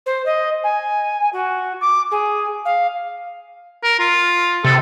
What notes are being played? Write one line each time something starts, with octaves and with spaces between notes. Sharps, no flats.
C5
D#5
G#5
F#4
D6
G#4
F5
A#4
F4
C3 A4